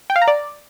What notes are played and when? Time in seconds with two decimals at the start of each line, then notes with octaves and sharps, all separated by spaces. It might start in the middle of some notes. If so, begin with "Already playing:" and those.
0.10 G5
0.16 F5
0.22 A#5
0.28 D5